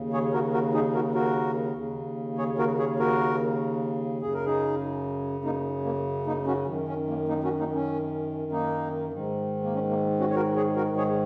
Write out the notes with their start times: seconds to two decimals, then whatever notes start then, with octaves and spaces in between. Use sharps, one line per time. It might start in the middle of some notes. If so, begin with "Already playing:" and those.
Already playing: D#2 C#3
0.13 G#4 C#5
0.33 F#4 A#4
0.53 F#4 A#4
0.74 D#4 G#4
0.94 F#4 A#4
1.15 F#4 A#4
1.77 D#2 C#3
2.38 G#4 C#5
2.58 F#4 A#4
2.78 G#4 C#5
2.99 F#4 A#4
4.21 F#2 C#3 G#4
4.34 A#4
4.46 D#4 G#4
5.45 A#3 D#4
5.85 A#3
6.27 A#3 D#4
6.47 C#4 F#4
6.67 F#2 D#3
6.88 C#4
7.08 A#3
7.29 A#3 D#4
7.44 C#4 F#4
7.59 A#3 D#4
7.75 C#4
8.52 A#3 D#4
9.12 G#2 D#3
9.63 A#3
9.75 C#4
9.90 A#3
10.20 C#4 F#4
10.30 C#5
10.35 F#4 A#4
10.56 G#4 C#5
10.76 F#4 A#4
10.97 G#4 C#5